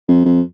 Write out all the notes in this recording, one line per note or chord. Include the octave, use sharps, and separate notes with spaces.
F2
F2